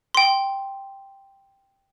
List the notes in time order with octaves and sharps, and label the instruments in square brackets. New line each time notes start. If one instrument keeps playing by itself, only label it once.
[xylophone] G5 C6